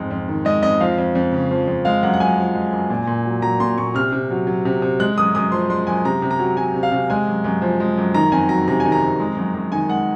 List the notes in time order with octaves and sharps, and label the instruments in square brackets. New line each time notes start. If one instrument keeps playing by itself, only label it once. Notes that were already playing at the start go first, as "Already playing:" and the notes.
Already playing: [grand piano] F2 G#2 G#3
F2
D#3
G#3 D#5
F2 D#5
F3 F5
F2
F2
C#3
F3
F2
G#3 F5
F#2 F#5
F#5
F#2 G#5
F3
G#3
F#2
A#2
A#2
F#3
F#3 A#5
A#2 C6
A#2 C#6
C3 F6
C3
F#3
F#3
C3
C3
G#3 F#6
F#2 D#6
F#2 D#6
F3 C6
G#3 C6
F#2 G#5
C3 A#5
C3
A#5
F#3
F#3 G#5
C3
F5
C3
G#3 G#5
F#2
F#2
F3
G#3
F#2
D#3 A#5
F2 G#5
F#3 A#5
C3 A#5
D#3 G#5
A#5
F2
G#3
F#2
F#2
D#3 G#5
G#3 F#5